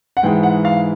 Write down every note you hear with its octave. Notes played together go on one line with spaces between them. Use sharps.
F#5
G#2 E3 G#3 G5
F#5
F5